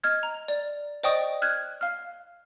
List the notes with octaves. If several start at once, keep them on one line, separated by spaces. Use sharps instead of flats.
D#5 F6 G#6
A#5
D5
C5 D5 D#5 G5 C#6 D#6
F6 F#6 G#6
F5 F6